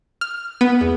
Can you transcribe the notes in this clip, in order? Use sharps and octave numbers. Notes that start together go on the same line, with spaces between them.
F6
B3
E2